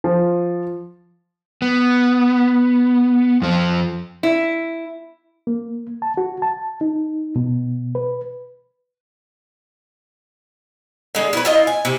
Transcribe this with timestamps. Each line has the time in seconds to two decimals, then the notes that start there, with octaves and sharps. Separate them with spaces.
0.04 F3
1.62 B3
3.42 F2 F3
4.23 E4
5.47 A#3
6.02 A5
6.17 F#4
6.42 A5
6.81 D#4
7.36 B2
7.95 B4
11.15 D3 G#3
11.33 E4 B4
11.45 E4 F4 D#5
11.67 G#5
11.85 C3